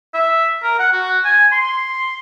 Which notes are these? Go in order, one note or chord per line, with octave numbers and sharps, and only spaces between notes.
E5
A#4
F#5
F#4
G#5
C6